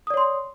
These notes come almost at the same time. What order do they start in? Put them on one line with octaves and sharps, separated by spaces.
D#6 D5 C#5 C6